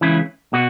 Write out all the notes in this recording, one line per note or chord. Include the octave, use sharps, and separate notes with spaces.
C#2 C#3 E3 E4
B2 F#4